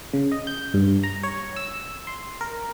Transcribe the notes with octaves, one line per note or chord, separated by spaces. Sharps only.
C#3
D#5
G6
G2
A#5
C#5
E6
C6
A#4